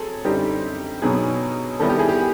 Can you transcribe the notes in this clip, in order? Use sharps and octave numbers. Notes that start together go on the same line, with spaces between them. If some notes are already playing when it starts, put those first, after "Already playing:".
Already playing: F#3 C4 G#4 A4
F#2 D3 G3 C4 D#4 G4
B2 F#3 B3 D#4 G#4
D#3 G3 B3 E4 A4
G4
G#4
G4